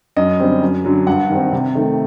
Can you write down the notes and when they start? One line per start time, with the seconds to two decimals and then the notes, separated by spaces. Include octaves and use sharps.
0.16 F#2 D#5
0.40 D3 G3 C4
0.62 F#2
0.85 D3 F#3
1.07 G2 F#5
1.30 D#3 G3 C4
1.52 C3
1.75 D#3 A3